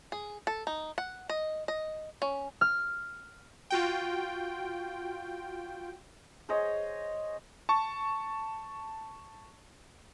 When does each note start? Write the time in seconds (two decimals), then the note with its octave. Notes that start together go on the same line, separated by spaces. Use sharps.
0.12 G#4
0.47 A4
0.67 D#4
0.98 F#5
1.29 D#5
1.68 D#5
2.22 C#4
2.61 F6
3.70 F4 F#4 G5
6.49 G#4 C5 C#5 D#5
7.69 A5 C#6